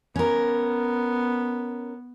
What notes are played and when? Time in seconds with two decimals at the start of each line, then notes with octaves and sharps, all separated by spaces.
0.16 B3 C#4 A#4